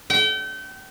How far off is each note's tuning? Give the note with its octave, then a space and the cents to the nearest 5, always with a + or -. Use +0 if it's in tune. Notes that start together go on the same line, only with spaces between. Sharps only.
G5 -35